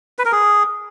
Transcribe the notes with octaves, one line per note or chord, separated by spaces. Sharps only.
B4
A#4
G#4